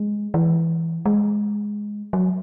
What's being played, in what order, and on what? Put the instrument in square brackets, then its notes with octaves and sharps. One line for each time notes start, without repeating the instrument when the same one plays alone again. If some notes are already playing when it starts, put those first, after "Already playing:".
Already playing: [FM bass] G#3
E3
G#3
F#3